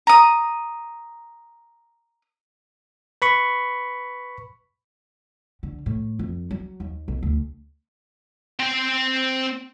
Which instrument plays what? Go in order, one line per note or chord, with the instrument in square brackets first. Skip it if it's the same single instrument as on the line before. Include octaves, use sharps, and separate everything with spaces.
[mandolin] A#5 D#6
[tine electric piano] B4 B5 C#6
[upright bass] D3
A2
F2
F#3
D#2
B1
D2
[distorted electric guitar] C4 G5